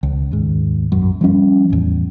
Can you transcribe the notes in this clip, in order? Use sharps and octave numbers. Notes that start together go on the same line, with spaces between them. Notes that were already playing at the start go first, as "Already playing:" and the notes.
C#2
D#2 G#2
B1 F#2
F3 G3 C#4
A1 E2